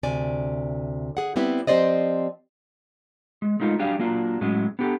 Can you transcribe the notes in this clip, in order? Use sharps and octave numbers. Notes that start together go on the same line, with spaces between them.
D2 C3 D5 G#5
G#4 F#5
G3 B3 C4 E4 G4
F3 C4 G4 C5 D5 D#5
G#3
G#3 A3 D#4 F4 A#4
F#3 G3 D4 G4 G#4 F5
F#3 A#3 D4 F4
A2 F#3 G#3 C#4
B3 D4 G4 A4